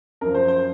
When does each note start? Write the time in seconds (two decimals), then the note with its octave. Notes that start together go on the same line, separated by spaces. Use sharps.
0.21 F#2 F3 A#4
0.34 C5
0.48 C5